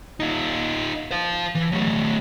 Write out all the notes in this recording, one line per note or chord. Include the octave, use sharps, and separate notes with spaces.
D#4 F4
C5 F5
E3
F#3 A3